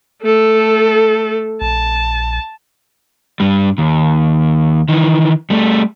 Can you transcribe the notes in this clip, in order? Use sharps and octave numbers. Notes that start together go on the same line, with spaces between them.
A3 A4
A#1 A5
G2 G3
D#2
D#3 E3
G3 A3